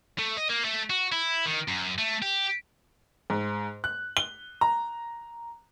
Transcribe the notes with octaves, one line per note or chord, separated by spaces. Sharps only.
A3
D#5
A#3
A3
F#4
E4
D#3
F#2
A3
G4
G#2
F#6
G7
A#5